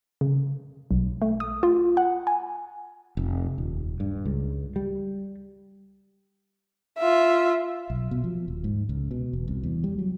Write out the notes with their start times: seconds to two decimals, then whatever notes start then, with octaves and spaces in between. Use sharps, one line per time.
0.21 C#3
0.91 B1
1.22 A3
1.40 D#6
1.63 F4
1.97 F#5
2.27 G#5
3.17 F1
3.58 D#1
4.00 G2
4.25 C#2
4.76 G3
6.99 F4 E5
7.90 B1
8.11 B2
8.24 F3
8.48 D#1
8.64 G#2
8.89 C#2
9.11 B2
9.33 E1
9.48 C2
9.63 E2
9.84 G3
9.99 F#3